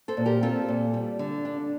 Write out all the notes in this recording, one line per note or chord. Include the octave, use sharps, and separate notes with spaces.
A4 C5
A#2
G4 A#4
C4 F4 A4
A#2
G3
D3
D4